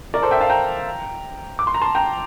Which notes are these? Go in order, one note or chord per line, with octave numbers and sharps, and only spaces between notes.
A#4 D5
A4 C5
E5 G5
F5 A5
G5 A#5
D6
C6
A#5
A5 C6
G5 A#5